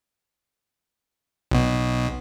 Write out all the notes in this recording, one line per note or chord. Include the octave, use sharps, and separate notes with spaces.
B1 B2